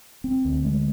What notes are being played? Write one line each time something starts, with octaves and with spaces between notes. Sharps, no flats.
C4
D2
G#3